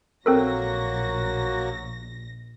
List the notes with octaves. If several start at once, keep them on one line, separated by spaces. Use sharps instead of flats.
A#1 F#3 A#3 C4 F#4 A4 A#4 A#6